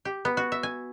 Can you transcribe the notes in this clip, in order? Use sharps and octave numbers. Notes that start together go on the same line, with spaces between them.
G4
B3
F#4
E5
G#5